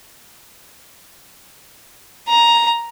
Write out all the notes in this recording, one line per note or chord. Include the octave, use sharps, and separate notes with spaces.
A#5